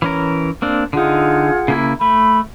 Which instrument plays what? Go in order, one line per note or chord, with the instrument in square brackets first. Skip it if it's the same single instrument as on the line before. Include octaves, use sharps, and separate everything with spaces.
[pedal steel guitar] E3 C#4 A#4
A#3 C4 D4
[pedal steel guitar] D3 D#4 [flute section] F4 G#4 F#5
[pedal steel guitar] C#3 A#3 E4
[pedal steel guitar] A3 [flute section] B5